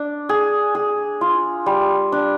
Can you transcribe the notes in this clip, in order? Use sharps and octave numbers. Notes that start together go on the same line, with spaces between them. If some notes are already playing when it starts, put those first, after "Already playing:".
Already playing: D4
G#4
G#4
F4
G3
D4